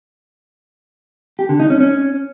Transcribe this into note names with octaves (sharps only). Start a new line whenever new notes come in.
G4
D3
D#4
C#4
C#4